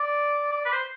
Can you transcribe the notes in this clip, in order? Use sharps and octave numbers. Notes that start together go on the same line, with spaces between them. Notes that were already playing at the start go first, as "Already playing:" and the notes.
Already playing: D5
D5
B4
C5